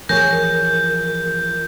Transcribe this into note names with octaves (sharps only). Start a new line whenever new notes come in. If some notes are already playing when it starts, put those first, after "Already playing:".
E3 F3 G#4 A#4 C#5 G#5 G6